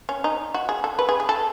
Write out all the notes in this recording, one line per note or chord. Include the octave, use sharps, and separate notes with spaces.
C#4
D#4
F#4
G#4
A4
B4
G#4
G#4
A4